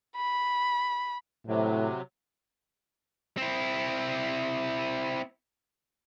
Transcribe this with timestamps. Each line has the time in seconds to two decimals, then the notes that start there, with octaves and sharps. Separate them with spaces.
0.16 B5
1.47 A2 C3 F#3
3.37 C4 E4